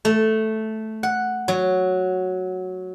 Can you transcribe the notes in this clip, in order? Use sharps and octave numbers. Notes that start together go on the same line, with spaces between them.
A3
F#5
F#3